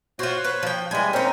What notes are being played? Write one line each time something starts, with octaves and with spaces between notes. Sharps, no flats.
F4 F#4 C5 C#5
B4
F3 G5
E3 G3 G#3 G#5
C4 C#4 D#4 A#4 C5